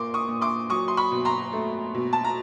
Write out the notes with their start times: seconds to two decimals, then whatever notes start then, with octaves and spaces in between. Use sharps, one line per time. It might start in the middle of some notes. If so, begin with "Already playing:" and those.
Already playing: A#2 A#3 C6 D6
0.14 C#6 D#6
0.28 A#2
0.41 C6 D6
0.70 F#3 C#6 D#6
0.88 C6
0.97 B5 C#6
1.11 B2
1.25 A#5 C6
1.53 A3
1.94 B2
2.13 A5
2.24 A#5